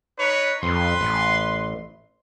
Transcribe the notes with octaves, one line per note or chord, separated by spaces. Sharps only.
D#4 B4 C#5
F2 B4 C6
A1